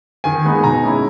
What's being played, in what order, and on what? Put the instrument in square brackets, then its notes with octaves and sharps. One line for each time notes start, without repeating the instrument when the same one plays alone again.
[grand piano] D#3 G#5
G#3 B3 D#4
B2 A#5
G#3 C#4 E4